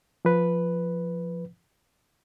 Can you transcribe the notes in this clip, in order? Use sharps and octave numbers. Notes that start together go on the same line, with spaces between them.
F3 B4